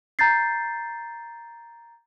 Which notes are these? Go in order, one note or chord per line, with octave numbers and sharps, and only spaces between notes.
A#5 G6 A6 C7